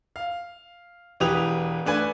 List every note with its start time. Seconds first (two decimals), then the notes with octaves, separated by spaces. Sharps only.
0.16 F5
1.20 E1 E3 G4 B4 D#6 F7
1.85 A3 D4 B4 G#5